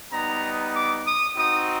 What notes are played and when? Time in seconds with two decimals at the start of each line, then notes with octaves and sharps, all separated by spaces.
0.12 G3 B3 D#4 A#5
0.74 D6
1.05 D#6
1.36 C4 D#4 F#4 D#6